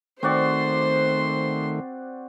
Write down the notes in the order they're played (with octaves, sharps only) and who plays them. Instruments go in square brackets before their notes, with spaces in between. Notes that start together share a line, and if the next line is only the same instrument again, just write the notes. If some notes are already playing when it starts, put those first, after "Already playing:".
[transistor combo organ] D#3 A3 [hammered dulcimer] C4 F#4 D5 [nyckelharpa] C5 C6